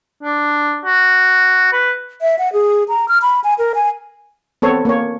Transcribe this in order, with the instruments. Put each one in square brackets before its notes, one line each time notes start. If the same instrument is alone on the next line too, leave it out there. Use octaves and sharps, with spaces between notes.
[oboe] D4
F#4
B4
[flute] E5
F#5
G#4
A#5
F6
B5
G#5
A#4
G#5
[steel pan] B3 C4 A4 C#5
A#3 C#5